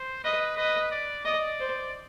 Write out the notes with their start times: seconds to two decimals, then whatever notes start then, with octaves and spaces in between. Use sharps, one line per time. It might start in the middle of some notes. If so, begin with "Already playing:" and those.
Already playing: C5
0.24 B4 D#5
0.57 B4 D#5
0.91 D5
1.25 D5 D#5
1.60 C5